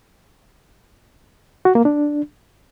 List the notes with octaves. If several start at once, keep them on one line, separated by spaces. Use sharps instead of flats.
F#4
A#3
D4